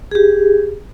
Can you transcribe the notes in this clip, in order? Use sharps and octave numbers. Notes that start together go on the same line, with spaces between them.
G4 G#4